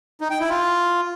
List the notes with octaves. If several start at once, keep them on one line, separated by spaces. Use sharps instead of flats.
D#4
G5
E4
F4